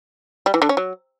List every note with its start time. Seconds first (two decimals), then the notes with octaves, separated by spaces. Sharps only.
0.46 G3
0.54 E3
0.62 D3
0.69 C#4
0.77 F#3